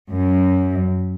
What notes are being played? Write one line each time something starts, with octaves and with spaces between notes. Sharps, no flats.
F#2